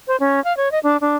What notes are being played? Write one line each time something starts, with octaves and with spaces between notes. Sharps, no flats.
C5
C#4
F5
C#5
D#5
D4
D4